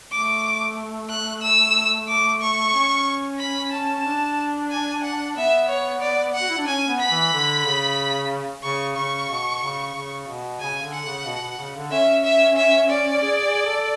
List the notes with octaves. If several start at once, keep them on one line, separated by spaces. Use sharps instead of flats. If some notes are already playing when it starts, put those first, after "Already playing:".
A3 D6
F#6
E6
D6
C#6
C#4
B5
A5
D4
G#5
F#5
B3 E5
C#5
D5
F#5
F#4
E4
D4
C#4 G#5
B3
B5
E3
D3
C#3
C#3 C#6
C#3 C#6
B2
C#3
C#3
B2
C#3 G#5
D3
F#5
C#3
B2
B2
C#3
D3
C#4 E5
E5
E5
D5
G#4
G#4
A4